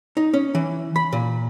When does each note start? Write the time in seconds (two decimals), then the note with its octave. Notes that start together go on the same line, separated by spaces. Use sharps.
0.17 D#4
0.34 C#4
0.55 E3
0.96 B5
1.13 A#2